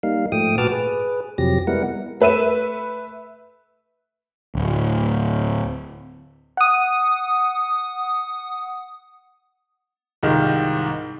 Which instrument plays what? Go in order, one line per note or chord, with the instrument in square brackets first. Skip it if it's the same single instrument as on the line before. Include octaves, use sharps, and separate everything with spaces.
[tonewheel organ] G3 A#3 D#4 F5
G#2 F3 A3 G5 D#6
A#2 F#4 B4 A5 D6 F6
G#4 B4
F2 C3 F3 F#3 G4 A#6
G3 G#3 B3 E4 A#4 F#5
[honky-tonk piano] A3 B4 E5 D#7 E7
[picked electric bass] D1
[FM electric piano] F#5 D#6
[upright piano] C2 G#2 D#3 F4